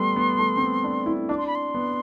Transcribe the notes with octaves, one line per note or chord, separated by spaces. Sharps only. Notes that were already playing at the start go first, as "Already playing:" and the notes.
Already playing: G3 A3 B3 C6
B3
A3
C4
B3
D4
E4
D4 D6
C6
B5
C6
B3